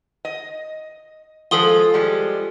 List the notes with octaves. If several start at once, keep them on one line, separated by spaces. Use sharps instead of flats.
D#5
F3 G#3 F4 A4 D#6 G7
F3 G3 G#3